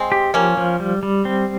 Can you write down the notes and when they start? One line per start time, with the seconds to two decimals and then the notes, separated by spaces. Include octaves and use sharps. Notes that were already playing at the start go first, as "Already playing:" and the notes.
Already playing: G#3 C4
0.12 G4
0.34 F3 A#3 C#4
0.57 F3
0.80 G3
1.03 G3
1.25 C4